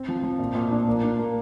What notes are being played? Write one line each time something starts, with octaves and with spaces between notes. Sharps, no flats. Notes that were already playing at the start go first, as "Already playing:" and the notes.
Already playing: C4
F3
F3
A#2
A#2
D4
A#3
D4
A#3